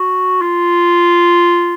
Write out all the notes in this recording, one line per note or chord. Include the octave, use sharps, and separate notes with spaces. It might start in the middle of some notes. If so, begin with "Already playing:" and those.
Already playing: F#4
F4